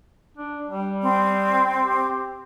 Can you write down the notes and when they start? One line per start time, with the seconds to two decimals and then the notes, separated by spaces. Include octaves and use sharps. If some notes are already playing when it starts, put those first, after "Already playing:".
0.37 D4
0.70 G3
1.02 C4
1.83 G4